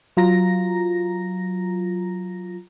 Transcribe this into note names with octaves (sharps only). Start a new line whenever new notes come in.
F#3 F4 A#5 A#6